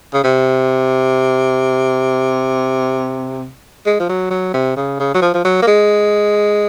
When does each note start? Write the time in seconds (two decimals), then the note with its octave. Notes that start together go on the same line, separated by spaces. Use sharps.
0.13 C#3
0.24 C3
3.86 G#3
4.00 F3
4.09 F#3
4.31 F#3
4.54 C3
4.76 C#3
5.00 C#3
5.14 F#3
5.22 F3
5.34 F3
5.45 F#3
5.62 A#3
5.67 G#3